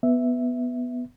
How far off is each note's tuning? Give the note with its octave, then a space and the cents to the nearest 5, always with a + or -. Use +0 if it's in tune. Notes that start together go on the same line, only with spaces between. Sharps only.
B3 +0 E5 +0